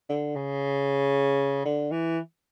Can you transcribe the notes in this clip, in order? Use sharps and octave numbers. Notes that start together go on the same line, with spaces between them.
D3
C#3
D3
E3